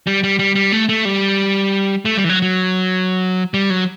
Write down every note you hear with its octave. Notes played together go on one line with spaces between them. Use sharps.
G3
G3
G3
G3
A3
A3
G3
A3
G3
E3
F#3
F#3
G3
F#3